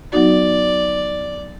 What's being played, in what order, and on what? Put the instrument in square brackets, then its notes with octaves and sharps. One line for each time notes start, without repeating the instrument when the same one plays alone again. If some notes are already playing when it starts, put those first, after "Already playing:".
[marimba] F#3 B3 D#4 F#4 [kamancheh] D5